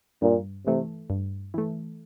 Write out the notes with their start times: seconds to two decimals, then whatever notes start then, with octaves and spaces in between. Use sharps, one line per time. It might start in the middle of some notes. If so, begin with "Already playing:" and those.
0.22 G2 A#2
0.66 C3 E3 A3
1.10 G2
1.54 E3 A3